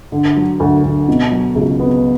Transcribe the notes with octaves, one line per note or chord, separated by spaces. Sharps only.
D3
F#3
D2
D2
B2
F#3
C#2
B3